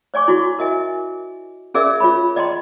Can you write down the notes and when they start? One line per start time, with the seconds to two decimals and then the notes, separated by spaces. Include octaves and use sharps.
0.14 C#5 D5 G#5 C#6 D6
0.28 E4 F#4
0.59 A#4 D#5 E5 G#5
1.74 C#4 G#4 A#4 D5 E5 E6
2.00 F4 C#5 B5
2.36 D5 D#5 G5 A#5 C6